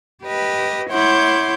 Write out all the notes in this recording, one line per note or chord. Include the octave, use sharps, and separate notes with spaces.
G4 B4 D#5
E4 C#5 F#5 C6 D6 G6